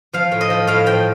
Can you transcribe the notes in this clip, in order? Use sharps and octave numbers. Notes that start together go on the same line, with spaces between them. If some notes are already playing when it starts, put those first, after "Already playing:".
F3 F5
A2
D#5
F3
A2 F5
F3 G5